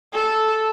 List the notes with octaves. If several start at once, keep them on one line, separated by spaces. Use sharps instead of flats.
A4